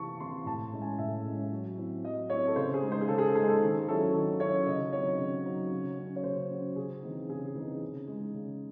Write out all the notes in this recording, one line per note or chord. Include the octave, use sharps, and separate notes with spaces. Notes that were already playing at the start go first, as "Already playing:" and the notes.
Already playing: C3 E3 C4 E4 A5 C#6
E3 C4 E4 C6
A2 A5
G#3 C#4 E4
G#5
A2 E5
G#3 C#4 E4
F#3
C4 E4
F#3 D#5
C4 E4 C#5
A4
C#3 C5
G#4
G#3 D#4
C5
G#4
C#3 A4
G#4
A4
G#3 D#4 G#4
C5
A4
D#3
F#3 C#4 E4 A4
D#3
F#3 C#4 E4 C#5
C#3 D#5
F#3 C4 D#4 C#5
C#3
F#3 C4 D#4
C#3
F#3 C#4
C#5
C#3 C5
F#3 C#4
C#3 G#4
E3 C4 D#4
C#3 G#4
G#4
E3 C4 D#4
C#3
G#3 D#4
C#3